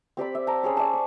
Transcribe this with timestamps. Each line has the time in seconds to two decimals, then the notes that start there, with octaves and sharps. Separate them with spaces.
0.17 C4 G4 D5 B5
0.35 E5
0.47 G5 A5 A#5
0.63 C#4 G#4 C5 C#5
0.77 D5 E5 G#5 A5
0.93 C#6